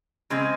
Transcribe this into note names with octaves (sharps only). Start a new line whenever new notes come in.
C#3 G#3 C4